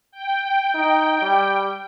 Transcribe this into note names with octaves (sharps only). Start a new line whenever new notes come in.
G5
D#4
G3